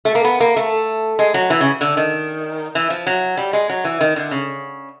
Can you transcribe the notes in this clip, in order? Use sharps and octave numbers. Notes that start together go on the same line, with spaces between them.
A3
A#3
B3
A#3
A3
G#3
F#3
E3
C#3
D3
D#3
E3
F3
F#3
G3
G#3
F#3
E3
D#3
D3
C#3